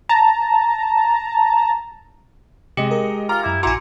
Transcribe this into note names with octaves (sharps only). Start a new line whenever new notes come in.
A5 A#5
C3 G#3 G4 D#5 C#7
A#4
F4 F5 G#5 A#5 D6
F#2 E4 D6
A#1 E4 F#4 G#5 A#5 C6 D6 C#7